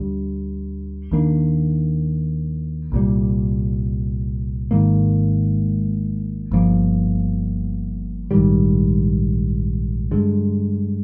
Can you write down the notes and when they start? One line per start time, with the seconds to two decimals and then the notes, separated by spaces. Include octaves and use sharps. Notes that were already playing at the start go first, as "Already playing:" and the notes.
Already playing: D2 D3 G3
1.12 D#2 D#3 A#3 D4
2.92 C2 A#2 G3
4.71 G#1 G#2 D#3 A#3
6.52 G1 G2 F3 A#3
8.31 A#1 G#2 D#3 G3
10.11 G2 D3 G#3